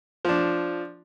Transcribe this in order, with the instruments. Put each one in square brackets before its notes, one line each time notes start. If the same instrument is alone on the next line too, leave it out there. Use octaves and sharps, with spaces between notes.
[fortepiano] F3 D4